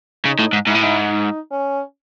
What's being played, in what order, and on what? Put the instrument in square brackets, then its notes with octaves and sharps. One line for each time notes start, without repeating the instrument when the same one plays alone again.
[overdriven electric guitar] C#3 [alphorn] D#4
[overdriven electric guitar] A2
G#2
[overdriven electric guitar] G#2 [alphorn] E4
[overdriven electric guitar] A2
G#2
[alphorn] D#4
C#4